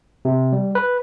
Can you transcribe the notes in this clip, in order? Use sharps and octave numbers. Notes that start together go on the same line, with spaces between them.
C3
G3
B4